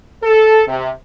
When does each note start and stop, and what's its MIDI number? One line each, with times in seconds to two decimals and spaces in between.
0.23 0.60 69
0.67 0.89 48